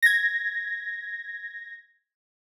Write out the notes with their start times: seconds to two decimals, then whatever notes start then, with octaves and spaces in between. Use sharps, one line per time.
0.02 G#6 A#6